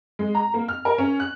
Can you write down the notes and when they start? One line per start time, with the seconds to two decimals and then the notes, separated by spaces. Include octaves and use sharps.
0.19 G#3
0.35 A#5
0.54 A#3
0.68 F6
0.85 A#4
0.98 C#4
1.20 F#6